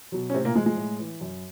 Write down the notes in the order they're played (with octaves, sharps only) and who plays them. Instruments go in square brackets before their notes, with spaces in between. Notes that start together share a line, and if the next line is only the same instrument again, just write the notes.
[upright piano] B2 F#3
C#4
A2 C3 C4
A#2 A#3
F3 G#3
G#3
A2
E3
F#2